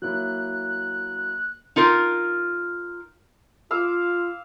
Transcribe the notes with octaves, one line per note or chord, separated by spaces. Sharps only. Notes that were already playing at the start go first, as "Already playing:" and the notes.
F#3 A#3 E4 F#6
D#4 F4 A#4
F4 F5 D6 E6